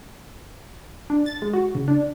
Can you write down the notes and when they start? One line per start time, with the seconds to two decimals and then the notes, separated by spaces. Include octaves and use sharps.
1.10 D4
1.26 A6
1.42 G#3
1.53 F#4
1.75 C#3
1.88 D4